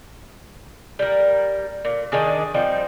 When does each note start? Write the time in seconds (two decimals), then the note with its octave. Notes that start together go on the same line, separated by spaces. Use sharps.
0.99 G3 A#4
1.85 A#2
2.12 D#3 D4 G#4 D5
2.54 F3 G3 C4 D#4